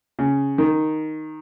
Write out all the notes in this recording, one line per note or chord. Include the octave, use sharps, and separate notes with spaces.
C#3
D#3